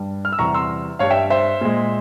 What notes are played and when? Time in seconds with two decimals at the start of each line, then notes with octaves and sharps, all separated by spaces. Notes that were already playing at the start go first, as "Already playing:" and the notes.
Already playing: G2 G3
0.25 F6
0.33 E6
0.39 E2 C3 G3 A#5 C#6
0.54 C6 E6
0.99 G2 G3 C#5 F5
1.10 E5 G5
1.30 C5 E5
1.61 A#2 G#3